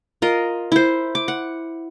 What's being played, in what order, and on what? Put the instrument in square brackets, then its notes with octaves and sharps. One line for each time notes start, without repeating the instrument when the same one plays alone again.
[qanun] F4 A#4 D#5
E4 C5
D6
F#5